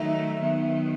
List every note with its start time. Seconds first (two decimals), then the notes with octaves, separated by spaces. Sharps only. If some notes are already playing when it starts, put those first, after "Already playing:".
Already playing: D#3 F#3 A3 D#4 E5
0.38 D#3 F#3 B3